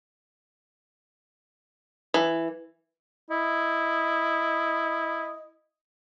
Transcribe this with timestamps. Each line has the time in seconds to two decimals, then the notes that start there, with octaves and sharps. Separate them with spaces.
2.14 E3
3.31 E4 D#5